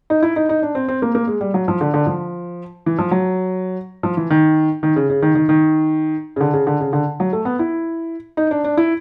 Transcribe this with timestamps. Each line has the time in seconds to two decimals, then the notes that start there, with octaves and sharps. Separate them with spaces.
0.10 D#4
0.23 E4
0.36 D#4
0.49 D#4
0.63 D4
0.75 C4
0.88 C4
1.02 A#3
1.15 A#3
1.27 G#3
1.41 G3
1.54 F#3
1.68 F3
1.81 D3
1.94 D3
2.06 F3
2.86 E3
2.99 F3
3.11 F#3
4.03 F3
4.17 E3
4.30 D#3
4.83 D#3
4.96 C#3
5.10 C#3
5.22 D#3
5.35 D#3
5.49 D#3
6.36 C#3
6.41 D3
6.53 C#3
6.67 D3
6.81 C#3
6.93 D3
7.20 F#3
7.33 A3
7.45 B3
7.59 E4
8.37 D#4
8.51 D4
8.64 D4
8.77 E4